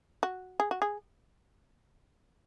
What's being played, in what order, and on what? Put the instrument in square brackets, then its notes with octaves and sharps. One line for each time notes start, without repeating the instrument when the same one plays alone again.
[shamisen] F#4
G#4
F#4
G#4